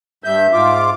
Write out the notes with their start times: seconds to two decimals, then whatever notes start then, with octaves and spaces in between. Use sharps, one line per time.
0.24 G2 E5 G6
0.53 G#2 F4 D6